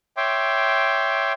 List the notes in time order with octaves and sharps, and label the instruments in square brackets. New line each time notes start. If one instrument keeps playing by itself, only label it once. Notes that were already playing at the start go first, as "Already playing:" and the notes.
[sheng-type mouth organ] C#5 E5 G5 C6 D6